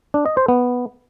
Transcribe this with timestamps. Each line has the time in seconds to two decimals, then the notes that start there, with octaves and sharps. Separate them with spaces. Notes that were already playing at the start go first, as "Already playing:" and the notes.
0.14 D4
0.26 D#5
0.37 C5
0.48 B3